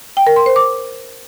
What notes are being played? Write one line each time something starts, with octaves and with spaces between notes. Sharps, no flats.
G5
A#4
C6
C5
D6